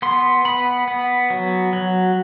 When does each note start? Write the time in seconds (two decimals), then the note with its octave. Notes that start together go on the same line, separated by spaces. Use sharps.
0.02 B3 C6
0.45 B3 B5
0.88 B3
1.30 F#3
1.73 F#3